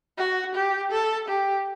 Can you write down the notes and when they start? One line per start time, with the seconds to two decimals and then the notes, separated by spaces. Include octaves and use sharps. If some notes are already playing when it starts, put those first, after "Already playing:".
0.18 F#4
0.55 G4
0.91 A4
1.28 G4